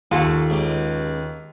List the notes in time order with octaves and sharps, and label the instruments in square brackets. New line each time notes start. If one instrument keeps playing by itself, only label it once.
[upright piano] D#2 [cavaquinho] F4 A4 C#6
[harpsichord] C#2 G4